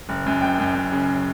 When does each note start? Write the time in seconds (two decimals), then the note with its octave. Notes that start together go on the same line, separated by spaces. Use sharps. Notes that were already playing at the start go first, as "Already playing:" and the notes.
0.09 F#1
0.26 F#2
0.42 F#1 G5
0.60 F#2
0.75 F#2
0.92 C#3